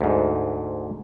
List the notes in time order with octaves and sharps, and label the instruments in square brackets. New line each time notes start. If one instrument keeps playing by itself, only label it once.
[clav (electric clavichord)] D2 G#2